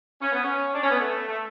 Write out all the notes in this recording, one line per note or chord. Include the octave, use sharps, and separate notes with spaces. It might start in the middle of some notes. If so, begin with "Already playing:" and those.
C#4
B3
C#4
D4
C#4
B3
A3
A3